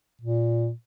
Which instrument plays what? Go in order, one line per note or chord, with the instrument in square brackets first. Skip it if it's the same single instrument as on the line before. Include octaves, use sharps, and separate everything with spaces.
[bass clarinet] A#2